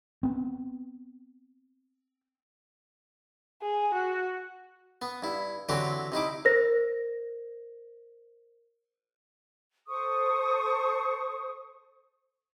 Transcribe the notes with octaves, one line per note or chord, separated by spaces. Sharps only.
B3 C4
G#4
F#4
B3
G2 E4
D3 E3 F#3 C4 F#4 G4
C3 D#4 E4 D6
A#4 C5 A#6
A4 C5 C#6 D#6